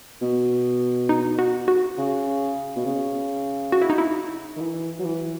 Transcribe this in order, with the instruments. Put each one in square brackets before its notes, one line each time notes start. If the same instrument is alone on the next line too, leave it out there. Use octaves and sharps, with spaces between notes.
[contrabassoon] B2
[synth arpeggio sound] D#4
F#4
F#4
[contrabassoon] C#3
B2
C#3
[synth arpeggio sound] F#4
E4
D#4
E4
[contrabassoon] D#3
E3
F#3
E3